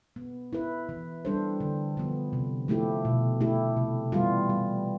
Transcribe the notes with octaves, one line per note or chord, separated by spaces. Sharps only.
B3
E4 B4
E3
G3 D4 A4 C5
D3
F3 B3
C3
F3 A3 E4 G4
B2
A3 E4 G4
C3
E3 G3 B3 F4
G3